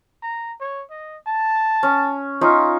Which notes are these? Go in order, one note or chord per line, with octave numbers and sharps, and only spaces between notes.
A#5
C#5
D#5
A5
C#4
C#4 D#4 F4 E5